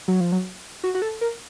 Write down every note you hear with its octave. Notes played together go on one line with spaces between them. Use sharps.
F#3
F3
F#3
F#4
F#4
A4
A#4